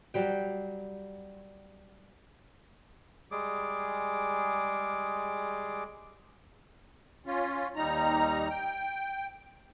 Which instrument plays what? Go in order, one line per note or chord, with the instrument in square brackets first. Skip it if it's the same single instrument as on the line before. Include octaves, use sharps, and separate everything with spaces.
[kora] F#3 G3 G5
[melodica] G3 G#3 G#4 D6
[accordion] C#4 F4
D#2 G3 D#4 A#5
G5